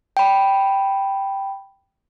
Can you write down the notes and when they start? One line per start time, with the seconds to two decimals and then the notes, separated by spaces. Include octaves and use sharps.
0.17 G5 B5